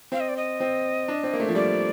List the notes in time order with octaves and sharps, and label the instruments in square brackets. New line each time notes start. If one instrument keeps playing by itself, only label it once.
[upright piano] C4 [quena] F5
[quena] D#5
D5
D#5
[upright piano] C4
D4
C4
A#3
A3
F3
[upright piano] G3 [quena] D5